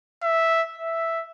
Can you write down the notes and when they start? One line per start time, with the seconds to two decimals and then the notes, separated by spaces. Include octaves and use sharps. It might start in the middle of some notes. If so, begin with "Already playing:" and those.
0.23 E5
0.78 E5